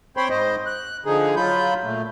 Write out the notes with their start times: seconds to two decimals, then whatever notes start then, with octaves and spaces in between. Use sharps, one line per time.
0.17 C4 C5 C#5 G5 B5 C6
0.30 G#2 C5 D#5
0.66 F#6
1.05 D3 F3 D#4 G#4
1.36 F#3 F4 B5 G6
1.84 A#2 A3